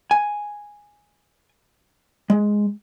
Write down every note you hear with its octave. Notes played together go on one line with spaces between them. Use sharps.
G#5
G#3